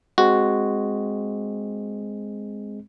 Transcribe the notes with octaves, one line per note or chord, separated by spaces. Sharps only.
G#3 C4 F#4